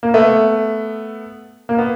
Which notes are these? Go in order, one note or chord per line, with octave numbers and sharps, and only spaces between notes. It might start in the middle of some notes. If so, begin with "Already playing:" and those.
A#3
A3 B3
A#3
B3